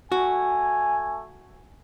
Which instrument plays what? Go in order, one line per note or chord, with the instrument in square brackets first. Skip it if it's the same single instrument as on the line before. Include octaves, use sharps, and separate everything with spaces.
[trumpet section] A3 G#5 [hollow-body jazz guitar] F#4